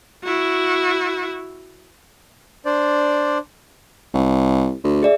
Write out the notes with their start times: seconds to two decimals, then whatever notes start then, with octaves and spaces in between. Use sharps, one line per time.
0.23 E4 F#4
2.66 D4 C5 D5
4.14 C2
4.84 D2
5.03 G#4 D5 E5